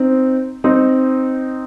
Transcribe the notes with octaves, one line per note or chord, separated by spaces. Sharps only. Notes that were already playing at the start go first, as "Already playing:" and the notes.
Already playing: C4 D#4
C4 D#4